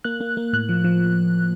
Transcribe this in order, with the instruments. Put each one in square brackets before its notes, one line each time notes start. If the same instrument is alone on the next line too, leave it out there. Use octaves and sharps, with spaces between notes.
[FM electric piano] A#3 F#6
A#3
A#3
A2 F#6
F3
F3